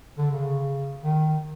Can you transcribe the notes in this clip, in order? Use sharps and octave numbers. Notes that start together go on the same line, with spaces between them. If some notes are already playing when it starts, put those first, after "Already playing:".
D3
C#3
D#3